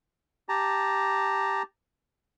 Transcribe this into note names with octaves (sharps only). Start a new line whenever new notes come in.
G4 A5 A#5